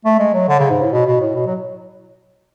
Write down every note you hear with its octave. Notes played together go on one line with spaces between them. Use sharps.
A3
G#3
F#3
D3
C#3
G#2
A2
B2
B2
A2
B2
F#3